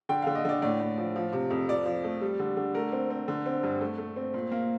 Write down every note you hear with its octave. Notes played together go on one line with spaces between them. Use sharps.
D3 G5
D3 F5
D#5
D3 D5
A2 D5
A2
F3
F3
C3
F2
F3 D5
F3
A3
G3
D3
D3
A3 A#4
C4
C4
D3
C4
G2
A3
A3
C4
A#2
A#3